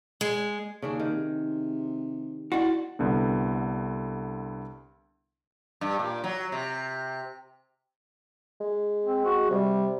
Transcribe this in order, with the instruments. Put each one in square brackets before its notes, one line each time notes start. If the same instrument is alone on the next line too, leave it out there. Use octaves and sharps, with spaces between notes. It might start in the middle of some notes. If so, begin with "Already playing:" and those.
[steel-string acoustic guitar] G#3
[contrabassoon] D#2 [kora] C#3 D4 G#4
[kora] D#3
[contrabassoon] C3
[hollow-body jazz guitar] D4 F#4 [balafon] E4 D#5
[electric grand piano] C2 D3 B3
[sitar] G2
A#2
F#3
C3
[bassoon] G#3
[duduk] C4
F#4
[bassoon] C3 [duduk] G3